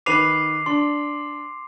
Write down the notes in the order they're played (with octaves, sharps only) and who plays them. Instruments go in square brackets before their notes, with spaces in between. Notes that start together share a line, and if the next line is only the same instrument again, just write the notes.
[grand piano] D#3 B4 D#7 [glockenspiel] D6 C7 F7
[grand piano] D4 [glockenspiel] C6